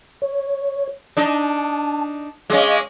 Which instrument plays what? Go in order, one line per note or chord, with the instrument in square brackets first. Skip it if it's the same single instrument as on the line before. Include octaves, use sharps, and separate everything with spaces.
[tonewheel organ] C#5
[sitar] D4 D#4 [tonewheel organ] A5
[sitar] G#3 C#4 [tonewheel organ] D#5 F5 D6